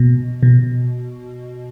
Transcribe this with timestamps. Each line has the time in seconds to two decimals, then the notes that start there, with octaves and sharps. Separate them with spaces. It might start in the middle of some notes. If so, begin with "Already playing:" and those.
Already playing: B2
0.43 B2